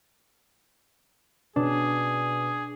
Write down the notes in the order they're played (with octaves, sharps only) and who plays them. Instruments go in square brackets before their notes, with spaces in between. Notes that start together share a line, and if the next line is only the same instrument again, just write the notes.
[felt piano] B2 [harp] D4 [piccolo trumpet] G#4